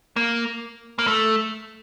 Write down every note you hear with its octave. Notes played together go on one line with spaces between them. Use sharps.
A#3
A#3
A3